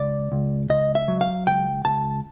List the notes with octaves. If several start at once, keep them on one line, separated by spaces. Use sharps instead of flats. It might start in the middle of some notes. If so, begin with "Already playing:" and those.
Already playing: C#2 D5
C#2
C#2 D#5
E5
F#3
F5
C#2 G5
C#2 A5